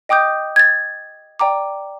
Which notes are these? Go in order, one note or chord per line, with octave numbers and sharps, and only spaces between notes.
D#5 G5 D6 D#6 G6
G#6 A6
D5 G5 A#5 D6